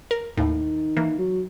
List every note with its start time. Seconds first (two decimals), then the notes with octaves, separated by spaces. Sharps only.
0.11 A#4
0.37 D#2 A2 D#3
0.97 E3 A#3
1.18 F#3